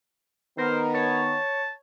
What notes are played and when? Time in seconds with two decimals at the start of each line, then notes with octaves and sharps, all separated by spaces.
0.58 D#3 B3 A#4 C5
0.94 C#5 A5